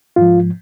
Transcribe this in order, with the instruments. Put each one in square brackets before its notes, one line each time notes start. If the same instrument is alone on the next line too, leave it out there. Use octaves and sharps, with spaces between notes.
[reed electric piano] G#2 F3 F4